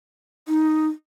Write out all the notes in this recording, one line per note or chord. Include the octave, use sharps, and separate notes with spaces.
D#4